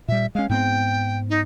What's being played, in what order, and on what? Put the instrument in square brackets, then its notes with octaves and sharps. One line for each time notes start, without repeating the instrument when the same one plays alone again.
[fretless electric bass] A#2 G3 [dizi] E5
[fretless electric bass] G#3 C#4 [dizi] F5
[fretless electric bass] G#2 B3 C4 [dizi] G5
[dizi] D#4